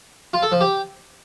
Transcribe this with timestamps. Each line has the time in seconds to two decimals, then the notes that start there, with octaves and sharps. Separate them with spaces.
0.33 F4
0.43 A4
0.52 F3
0.61 G4